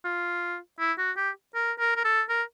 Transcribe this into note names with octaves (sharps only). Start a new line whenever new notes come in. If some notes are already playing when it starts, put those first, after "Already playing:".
F4
E4
F#4
G4
A#4
A#4
A#4
A4
A#4